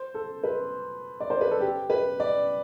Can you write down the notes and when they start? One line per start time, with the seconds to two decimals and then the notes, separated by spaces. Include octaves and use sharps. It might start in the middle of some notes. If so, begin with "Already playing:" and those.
Already playing: C5
0.14 A4
0.44 B4
1.20 D5
1.30 C5
1.41 B4
1.51 A4
1.60 G4
1.90 B4
2.20 D5